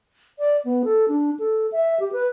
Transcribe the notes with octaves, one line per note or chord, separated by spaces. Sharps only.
D5
B3
A4
D4
A4
E5
G4
B4